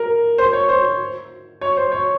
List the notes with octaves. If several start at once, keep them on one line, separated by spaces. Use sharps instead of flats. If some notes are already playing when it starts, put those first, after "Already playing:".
Already playing: A#4
C5
C#5
C5
C#5
C5
C#5